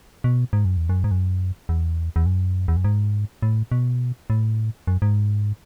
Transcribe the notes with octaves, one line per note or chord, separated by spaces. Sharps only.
B2
G#2
F#2
E2
F#2
G#2
F#2
E2
E2
F#2
E2
F#2
G#2
A2
B2
A2
F#2
G#2